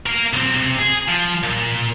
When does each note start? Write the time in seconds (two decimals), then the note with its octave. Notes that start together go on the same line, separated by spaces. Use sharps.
0.07 A#4 F5
0.33 B1 C4
0.55 C3
0.79 G#4
1.08 F3
1.43 A#2